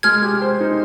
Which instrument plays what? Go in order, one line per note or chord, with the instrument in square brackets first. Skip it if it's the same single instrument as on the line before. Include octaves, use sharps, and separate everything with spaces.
[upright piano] G#3 [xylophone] F6 G#6
[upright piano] G4
C5
D#4